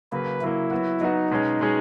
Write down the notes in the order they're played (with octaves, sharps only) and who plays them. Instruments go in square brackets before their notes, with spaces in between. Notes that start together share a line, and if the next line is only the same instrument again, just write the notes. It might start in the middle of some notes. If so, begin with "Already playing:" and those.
[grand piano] C#3 F#3 A#3 [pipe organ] B4
[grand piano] C#3 F#3 A#3 [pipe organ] E4
[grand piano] F#3 B3 F#4
[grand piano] F#3 B3 F#4 [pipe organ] D#4
[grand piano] B2 G#3 C#4 G#4
B2 G#3 C#4 G#4